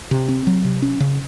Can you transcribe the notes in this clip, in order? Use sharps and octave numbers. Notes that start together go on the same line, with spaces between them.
C3
C4
F#3
C3
C#4
C#3